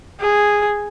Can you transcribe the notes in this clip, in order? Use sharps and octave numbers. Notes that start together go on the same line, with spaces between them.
G#4